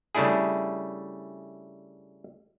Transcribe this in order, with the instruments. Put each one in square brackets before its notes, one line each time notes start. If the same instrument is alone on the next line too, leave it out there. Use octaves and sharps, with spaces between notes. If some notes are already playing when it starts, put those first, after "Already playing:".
[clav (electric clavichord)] C#3 G3 A3 D4 E4 G#4